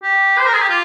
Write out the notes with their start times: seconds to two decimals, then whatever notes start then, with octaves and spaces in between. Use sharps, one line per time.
0.03 G4
0.38 C5
0.46 A#4
0.54 G#4
0.61 G4
0.69 F4